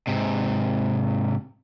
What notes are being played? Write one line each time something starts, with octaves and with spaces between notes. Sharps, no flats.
G#2 C3